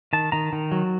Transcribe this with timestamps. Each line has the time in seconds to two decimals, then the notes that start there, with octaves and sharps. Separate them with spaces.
0.13 D#3 A5
0.32 D#3 A#5
0.53 D#3
0.72 F#3